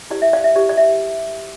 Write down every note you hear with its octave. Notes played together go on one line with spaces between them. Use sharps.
E4 G4 C5 D5
E5
D5 F5
E5
E4 G4 C5 D5
D5
E5